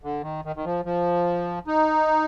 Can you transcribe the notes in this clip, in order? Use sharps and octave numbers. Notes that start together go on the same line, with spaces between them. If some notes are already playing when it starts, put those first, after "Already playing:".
D3
D#3
D#3
D#3
F3
F3
D#4